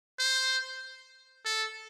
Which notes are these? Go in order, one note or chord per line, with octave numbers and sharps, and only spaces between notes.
C5
A4